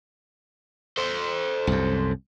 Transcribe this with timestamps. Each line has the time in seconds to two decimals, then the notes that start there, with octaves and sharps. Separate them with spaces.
0.97 A4 C5
1.67 C2 F#2